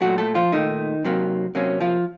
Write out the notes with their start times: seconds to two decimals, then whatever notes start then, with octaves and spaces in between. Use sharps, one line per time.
0.01 A#2 F#3 A3 F#4
0.18 A3 A4
0.35 F3 F4
0.52 A#2 D#3 A3 D#4
1.04 C3 F#3 A#3
1.55 C3 F#3 A#3 C#4
1.81 F3 F4